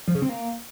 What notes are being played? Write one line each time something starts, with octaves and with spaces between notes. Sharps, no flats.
F3
C#3
C4
A#3